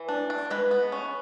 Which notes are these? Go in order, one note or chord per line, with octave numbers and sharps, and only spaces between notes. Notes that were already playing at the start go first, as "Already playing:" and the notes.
Already playing: E3
D4
D4
G#3 B4
B3
C#4